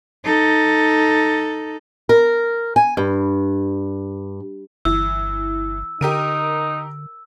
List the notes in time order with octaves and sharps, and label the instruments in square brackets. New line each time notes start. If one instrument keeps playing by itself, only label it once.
[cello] D#4 A4
[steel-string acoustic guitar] A#4
G#5
G2
[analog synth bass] G1 [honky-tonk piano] E3 [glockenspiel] E6
[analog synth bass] D3 [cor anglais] D#4 [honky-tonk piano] G4 A#4 D#7